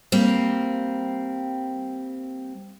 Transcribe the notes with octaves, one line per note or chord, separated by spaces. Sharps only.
G3 A#3 C4